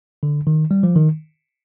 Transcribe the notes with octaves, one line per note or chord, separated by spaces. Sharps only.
D3
D#3
G3
F3
D#3